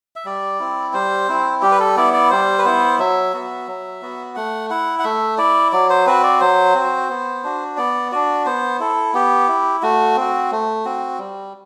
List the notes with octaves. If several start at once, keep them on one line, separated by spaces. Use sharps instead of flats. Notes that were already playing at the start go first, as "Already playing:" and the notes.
E5
G3 D5
C4 E4
G3 C5
C4 E4
G3 G4
B4
A4
B3 E4 D5
D5
G3 C5
B4
B3 E4 C5
F#3 E5
B3 F#4
F#3
B3 F#4
A3 F#5
E4 F#5
F#5
A3 E5
E4 D5
F#3 D5
C5
C4 F#4 B4
D5
F#3 C5
C4 F#4
B3
D4 F#4
B3 D5
D4 F#4 D5
B3 C5
E4 A4
B3 G4
E4
A3 F#4
C4 F#4
A3
C4 F#4
G3